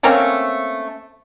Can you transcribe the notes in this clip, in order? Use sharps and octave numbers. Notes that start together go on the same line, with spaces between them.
A3 A#3 C4 C#4